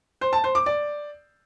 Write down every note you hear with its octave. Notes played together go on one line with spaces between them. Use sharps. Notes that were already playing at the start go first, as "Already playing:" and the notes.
C5
A5
C5
D6
D5